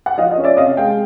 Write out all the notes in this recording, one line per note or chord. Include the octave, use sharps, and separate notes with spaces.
F#5
F3 D#5 F5
D#5
C#4
D5 E5
C3 D#5 F5
G#3 F5 G5